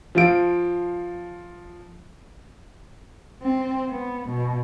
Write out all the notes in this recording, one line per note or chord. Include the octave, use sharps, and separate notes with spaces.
F3 F4 D7
C4
B3
B2